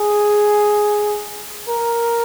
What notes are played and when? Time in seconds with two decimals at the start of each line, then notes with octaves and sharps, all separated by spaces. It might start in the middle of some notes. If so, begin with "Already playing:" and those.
Already playing: G#4
1.69 A#4